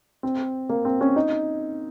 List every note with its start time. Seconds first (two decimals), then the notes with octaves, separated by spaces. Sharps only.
0.23 C4
0.69 A#3
0.85 C4
1.01 C#4
1.16 D#4